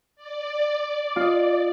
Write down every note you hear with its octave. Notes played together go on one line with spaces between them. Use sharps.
D5
F4 D#5